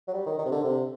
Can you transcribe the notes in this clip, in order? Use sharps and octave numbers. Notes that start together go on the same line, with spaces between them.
F#3
G3
D#3
D#3
C3
D3
C3